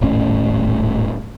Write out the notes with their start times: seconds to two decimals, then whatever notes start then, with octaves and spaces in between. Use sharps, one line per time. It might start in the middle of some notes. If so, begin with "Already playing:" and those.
0.01 D#1 G#1 A2 C#4